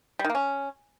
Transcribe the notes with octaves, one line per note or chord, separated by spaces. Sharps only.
G3
D#3
A#3
C#4